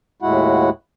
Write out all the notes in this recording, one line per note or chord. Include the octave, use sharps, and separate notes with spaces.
D#2 A2 G#3 E4 F#4 F#5